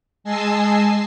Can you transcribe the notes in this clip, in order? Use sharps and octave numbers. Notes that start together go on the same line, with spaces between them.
G#3 D#5 G#5 A5 E6 C7